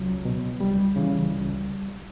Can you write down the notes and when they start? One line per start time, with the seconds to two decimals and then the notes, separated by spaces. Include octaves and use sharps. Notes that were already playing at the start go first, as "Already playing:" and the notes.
Already playing: C#2 F#3
0.25 B2
0.60 C#2 G3
0.96 C#3 E3
1.32 C#2